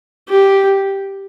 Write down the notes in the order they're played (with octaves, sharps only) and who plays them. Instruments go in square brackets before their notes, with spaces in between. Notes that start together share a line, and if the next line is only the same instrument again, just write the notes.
[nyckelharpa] G4